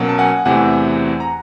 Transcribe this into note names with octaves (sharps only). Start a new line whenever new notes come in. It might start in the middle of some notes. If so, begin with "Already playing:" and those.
Already playing: B2 F#3 A#3 C#4
A5
F#5 G#5
E2 C3 E3 A3 C4 F#5 G#5
A#5